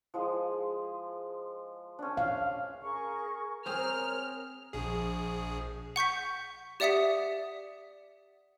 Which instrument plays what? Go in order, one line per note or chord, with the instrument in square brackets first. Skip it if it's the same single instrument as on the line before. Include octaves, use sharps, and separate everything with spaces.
[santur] F3 G#3 G#4
C#4 D4
[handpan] F5
[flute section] G#4 A#4 C#6
[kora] C4 G#4 C5 [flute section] A#4 C#5 [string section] F6
[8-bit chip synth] A#1 G#4
[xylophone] F#5 C#6 G6 B6
G4 D5 E5 F#5 D#6 B6